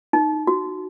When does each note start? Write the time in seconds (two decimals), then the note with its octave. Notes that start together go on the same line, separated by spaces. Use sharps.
0.13 D#4
0.47 F#4